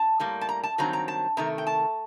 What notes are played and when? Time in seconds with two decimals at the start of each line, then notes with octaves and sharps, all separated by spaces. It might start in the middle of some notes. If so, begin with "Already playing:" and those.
Already playing: A5
0.20 A2 G3 A#3
0.41 A5
0.49 A#5
0.63 A5
0.78 G2 D#3 F#3 C4 A#5
0.93 A#5
1.08 A5
1.37 C3 D#3 A3 A#5
1.58 G5
1.67 A5